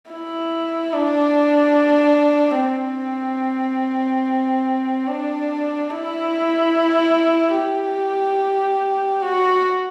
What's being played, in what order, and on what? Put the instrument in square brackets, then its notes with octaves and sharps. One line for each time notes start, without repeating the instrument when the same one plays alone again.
[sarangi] E4
D4
C4
D4
E4
G4
F#4